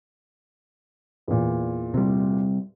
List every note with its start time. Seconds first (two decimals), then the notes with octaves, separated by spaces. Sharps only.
1.28 E2 A#2
1.94 C3 G3